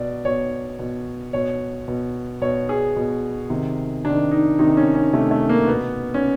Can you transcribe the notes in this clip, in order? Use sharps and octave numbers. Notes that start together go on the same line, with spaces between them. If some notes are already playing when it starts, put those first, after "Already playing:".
Already playing: B2 D5
B2 C#5
B2
B2 C#5
B2
B2 C#5
G#4
B2
C3 D#3
C3 D#3 D4
D#4
C3 D#3 D#4
C#4
C#4
C3 D#3 A3
A3
A#3
B2 B3
C#4